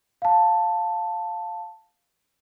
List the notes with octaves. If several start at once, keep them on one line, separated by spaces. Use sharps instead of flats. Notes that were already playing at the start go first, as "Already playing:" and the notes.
F5 A5